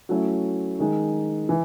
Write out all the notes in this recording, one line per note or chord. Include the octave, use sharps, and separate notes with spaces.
F#3 A3 C#4 E4
D#3 G#3 D#4
E3